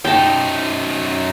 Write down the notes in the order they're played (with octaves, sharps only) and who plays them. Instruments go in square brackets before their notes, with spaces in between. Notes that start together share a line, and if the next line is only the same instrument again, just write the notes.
[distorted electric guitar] F#2 D#4 [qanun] G5 A5